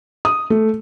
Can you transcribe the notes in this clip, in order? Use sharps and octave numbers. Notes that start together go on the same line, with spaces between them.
D#6
A3